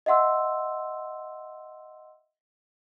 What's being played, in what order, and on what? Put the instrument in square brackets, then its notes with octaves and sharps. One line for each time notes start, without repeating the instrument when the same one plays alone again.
[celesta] D#5 E5 F#5 C6 E6